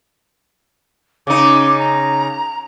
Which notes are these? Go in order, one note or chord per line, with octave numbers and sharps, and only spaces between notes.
C#3 D#4 D6
A#5